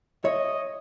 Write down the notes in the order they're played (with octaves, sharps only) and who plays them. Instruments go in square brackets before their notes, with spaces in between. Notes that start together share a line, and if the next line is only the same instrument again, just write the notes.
[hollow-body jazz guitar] C#5 E5 [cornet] D#5